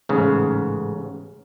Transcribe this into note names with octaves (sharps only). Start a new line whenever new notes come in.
A1 G#2 C#3